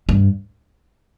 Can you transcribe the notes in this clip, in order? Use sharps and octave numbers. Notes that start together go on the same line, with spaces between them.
G2